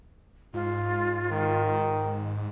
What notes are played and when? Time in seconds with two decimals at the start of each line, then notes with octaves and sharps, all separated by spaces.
0.54 G#2 F4
1.31 D#3